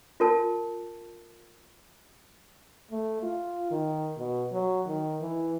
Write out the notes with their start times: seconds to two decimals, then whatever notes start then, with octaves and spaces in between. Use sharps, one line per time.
0.20 F4 A#4 A5
2.91 A3
3.23 F4
3.71 D#3
4.18 B2
4.52 F#3
4.87 D#3
5.21 E3